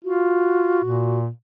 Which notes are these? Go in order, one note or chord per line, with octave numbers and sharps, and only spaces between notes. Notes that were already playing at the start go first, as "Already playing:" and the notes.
F4 F#4
A#2